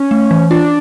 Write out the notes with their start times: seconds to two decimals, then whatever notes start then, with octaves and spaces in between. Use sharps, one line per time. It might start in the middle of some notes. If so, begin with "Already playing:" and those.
Already playing: C#4
0.11 A3
0.31 E3
0.50 D4 F4